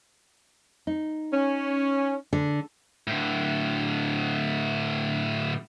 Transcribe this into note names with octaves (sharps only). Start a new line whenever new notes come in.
D#4
C#4
D3
A2 D3